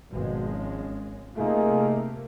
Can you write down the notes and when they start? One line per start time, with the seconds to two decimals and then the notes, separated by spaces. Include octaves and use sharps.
0.12 G#1 B2 F3 G#3
0.50 C#4
1.36 C3 A3 A#3 D#4 F4 G#4